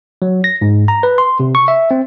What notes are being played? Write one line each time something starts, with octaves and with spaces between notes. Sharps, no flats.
F#3
A#6
G#2
A#5
B4
C6
C3
C#6
E5
C4